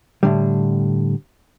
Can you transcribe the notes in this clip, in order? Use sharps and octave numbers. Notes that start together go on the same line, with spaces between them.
A2 D3 G3